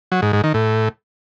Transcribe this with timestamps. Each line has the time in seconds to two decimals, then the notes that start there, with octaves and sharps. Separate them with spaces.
0.12 F#3
0.22 G#2
0.33 G#2
0.44 D#3
0.54 A2